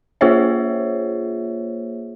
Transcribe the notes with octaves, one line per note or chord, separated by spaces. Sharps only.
A#3 F4 G#4 C5 C#5 E5